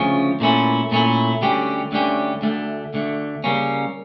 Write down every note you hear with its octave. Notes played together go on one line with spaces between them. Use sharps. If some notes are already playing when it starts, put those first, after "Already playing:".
Already playing: D2 C#3 F3 C#4
A#2 A3 C#4 E4
A#2 A3 C#4 E4
D2 D3 G3 C#4 G4
D2 D3 G3 C#4 G4
D2 D3 A3
D2 D3 A3
C#3 G3 A#3 C#4